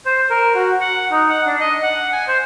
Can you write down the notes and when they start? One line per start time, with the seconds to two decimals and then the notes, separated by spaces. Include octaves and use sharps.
0.06 C5
0.30 A#4
0.55 F#4
0.81 F#5
1.11 D#4
1.29 F#5
1.46 D4
1.60 D#5
1.83 F#5
2.12 G#5
2.27 C5